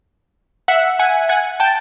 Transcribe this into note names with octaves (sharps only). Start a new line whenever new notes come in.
E5 F#5
F#5 G#5
F#5 G#5
G5 A5